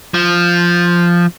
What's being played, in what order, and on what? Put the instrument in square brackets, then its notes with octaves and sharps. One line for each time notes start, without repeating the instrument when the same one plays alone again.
[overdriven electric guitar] F3